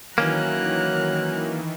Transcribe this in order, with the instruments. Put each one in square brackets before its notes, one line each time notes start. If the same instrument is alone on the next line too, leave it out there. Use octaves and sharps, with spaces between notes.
[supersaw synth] D#3 E3 [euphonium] F#3 [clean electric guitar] A#3 C#4 [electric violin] A#5 F#6